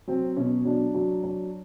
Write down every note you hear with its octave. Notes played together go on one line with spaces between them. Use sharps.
F#3 C4
B2 C#4
F#3 D4
F#3
F#3